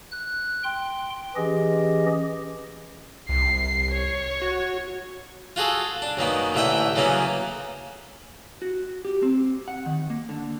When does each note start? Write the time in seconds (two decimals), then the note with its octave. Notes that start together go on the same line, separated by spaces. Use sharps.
0.11 F#6
0.64 G5 C6
1.36 E3 C#4 G4 G#4 D#5
3.29 C2 C7
3.92 C#5
4.42 F#4
5.56 F4 F#4 G#4 A4
6.02 D4
6.17 F#2 D#3 A#3 B3
6.54 A1 D3 E3 E5 F#5 G5
6.96 C#3 E3 F#3 A#3 B3 C#4
8.62 F#4
9.05 G4
9.23 C4
9.68 F#5
9.86 D#3
10.10 A#3
10.29 D3